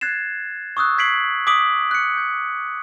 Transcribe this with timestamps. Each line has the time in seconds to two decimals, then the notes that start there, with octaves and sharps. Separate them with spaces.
0.01 F#6 G#6 A6 C7 E7
0.77 C#6 D#6 E6 F#6
0.98 G6 G#6 B6 C7 D7 F#7
1.47 D6 D#6 B6 D7 F#7
1.91 F#6 C#7
2.18 G6